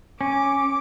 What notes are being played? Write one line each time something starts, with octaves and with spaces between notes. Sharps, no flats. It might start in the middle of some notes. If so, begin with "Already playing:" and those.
C#4 D6